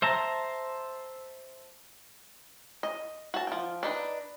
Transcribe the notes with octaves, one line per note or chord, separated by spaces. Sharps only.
C5 E5 A5 A#5
D#5
F#4 A5
F3 G5
D4 D#4 B4